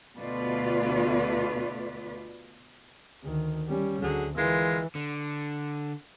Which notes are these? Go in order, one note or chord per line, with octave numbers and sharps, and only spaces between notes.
D2 B2 A3 F4 B4 D5
D2 D#3
G3 C#4
D2 D3 F#3 G#4
E3 G#3 F4 A#4
D3